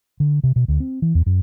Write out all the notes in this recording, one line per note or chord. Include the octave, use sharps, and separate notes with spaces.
D3
C3
B2
D2
C4
E3
E2
F#2